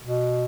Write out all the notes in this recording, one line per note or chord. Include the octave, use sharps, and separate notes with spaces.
B2